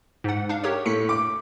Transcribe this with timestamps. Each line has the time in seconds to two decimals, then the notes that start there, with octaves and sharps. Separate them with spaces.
0.24 G#2 F#5
0.49 D4 F5
0.63 G4 A#4 C#5
0.86 A2 B6 C#7
1.09 D6